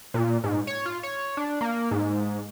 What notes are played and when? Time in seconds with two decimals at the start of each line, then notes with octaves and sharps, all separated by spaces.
0.14 A#2
0.44 G#2
0.67 C#5
0.85 F4
1.03 C#5
1.37 D4
1.61 A#3
1.91 G#2